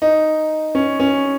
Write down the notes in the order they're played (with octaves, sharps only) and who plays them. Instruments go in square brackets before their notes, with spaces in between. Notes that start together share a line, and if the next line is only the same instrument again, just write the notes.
[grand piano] D#4
C#4
C#4